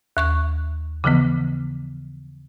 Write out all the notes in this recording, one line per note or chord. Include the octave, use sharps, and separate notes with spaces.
D#2 C#6 F#6
C#3 E3 F3 B3